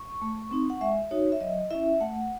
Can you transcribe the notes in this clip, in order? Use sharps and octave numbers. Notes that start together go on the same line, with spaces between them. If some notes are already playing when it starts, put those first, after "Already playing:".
Already playing: C#6
A3
C4 D#4
F#5
G#3 E5
D#4 F#4 C#5
E5
F#3 D#5
C#4 E4 E5
A3 F#5